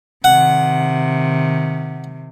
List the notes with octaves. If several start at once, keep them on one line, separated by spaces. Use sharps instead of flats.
C3 D#3 F#5